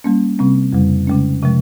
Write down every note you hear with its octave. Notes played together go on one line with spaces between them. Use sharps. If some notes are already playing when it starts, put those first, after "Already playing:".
G3 A#3 C#4
C3 G3 C4
F2 C#3 G3
C#3 G#3 C#4
C3 F3 G#3